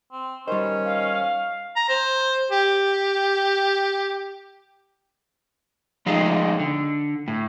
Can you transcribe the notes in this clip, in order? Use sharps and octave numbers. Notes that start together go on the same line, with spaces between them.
C4
D#3 G3 C#4 C5
F5
A#5
C5
G4
F3 G#3 A3 D#4 G#4
D3
A2